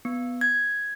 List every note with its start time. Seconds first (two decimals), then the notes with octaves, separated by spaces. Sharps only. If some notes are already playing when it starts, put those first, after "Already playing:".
0.05 B3
0.41 G#6